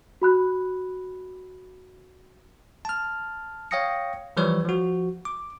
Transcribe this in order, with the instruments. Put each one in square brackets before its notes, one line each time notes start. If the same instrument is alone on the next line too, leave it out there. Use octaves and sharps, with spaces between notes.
[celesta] F#4 B5 F#6
[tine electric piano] A5 F6
C#5 F5 G5 D#6 A#6 C#7
E3 F3 G3 B4 C#5
F3 F#4
D6